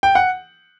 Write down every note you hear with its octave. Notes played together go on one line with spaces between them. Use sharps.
G5
F#5